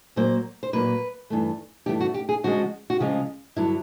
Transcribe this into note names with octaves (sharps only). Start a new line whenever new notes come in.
A#2 F#3 A#3 C5
C5
A#2 F#3 A#3 B4
G2 E3 A3
G2 E3 A3 G4
F#4
G4
G#4
D2 C#3 F3 G#3 F#4
F#4
D2 C#3 F3 G#3 F4
G2 D3 F#3 E4